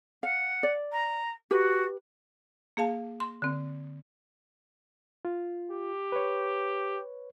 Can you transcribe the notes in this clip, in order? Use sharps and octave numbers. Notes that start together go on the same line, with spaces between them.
F5 F#5
D5
A#5
F#4 G4 B4
A#3 G#4 F5 A5
C6
D3 C4
F4
G4
B4 C#5